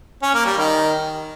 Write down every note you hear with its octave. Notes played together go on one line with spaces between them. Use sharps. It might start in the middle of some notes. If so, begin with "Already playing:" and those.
C#4
A#3
G3
D#3